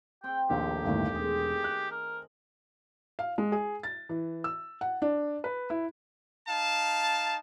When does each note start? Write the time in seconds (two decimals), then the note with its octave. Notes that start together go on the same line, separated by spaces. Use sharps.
0.24 C4 G5
0.50 A#1 D#2 D#3 A3 G4
0.84 G1 D#2 A2
1.13 E1 G#4 C5
1.64 F#6
1.91 A#4
3.19 F5
3.38 G#3
3.52 G#4
3.83 A6
4.09 E3
4.44 E6
4.81 F#5
5.02 D4
5.44 B4
5.70 E4
6.48 D#4 F5 A5